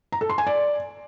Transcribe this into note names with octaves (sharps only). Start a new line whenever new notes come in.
A#5
A4
C6
G#5
D5